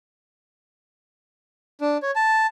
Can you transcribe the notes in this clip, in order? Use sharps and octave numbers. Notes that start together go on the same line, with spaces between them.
D4
C#5
A5